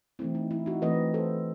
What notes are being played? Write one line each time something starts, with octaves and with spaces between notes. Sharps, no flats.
E3 A3 C4 E4
D#4
E4
D#4 F#4
E3 A3 C4 B4 D#5
A4 C5